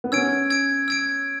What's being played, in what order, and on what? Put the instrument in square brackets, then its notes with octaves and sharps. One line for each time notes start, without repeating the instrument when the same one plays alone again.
[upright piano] B3
[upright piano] C#4 [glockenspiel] E6 G#6 D7
[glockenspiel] E6 G#6 D7
E6 G#6 D7